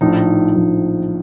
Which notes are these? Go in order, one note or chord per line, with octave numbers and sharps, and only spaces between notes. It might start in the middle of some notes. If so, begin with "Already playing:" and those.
A#1 A2 F3 D#4
A#1 A2 F3